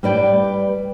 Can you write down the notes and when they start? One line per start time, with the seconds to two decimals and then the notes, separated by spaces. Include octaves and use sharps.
0.03 G3 B4 D5 G5